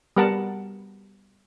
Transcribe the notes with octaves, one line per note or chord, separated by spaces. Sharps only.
G3 B3 A#4 F#5 A5